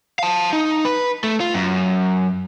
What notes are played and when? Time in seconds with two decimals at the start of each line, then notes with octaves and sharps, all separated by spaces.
0.19 F5 A5
0.53 D#4
0.85 B4
1.24 A3
1.40 F4
1.54 F#2